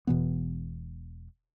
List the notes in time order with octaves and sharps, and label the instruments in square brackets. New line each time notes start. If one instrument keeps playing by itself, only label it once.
[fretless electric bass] E1 B2 E3 B3